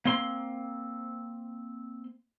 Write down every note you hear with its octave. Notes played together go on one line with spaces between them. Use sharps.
A#3 C4 C6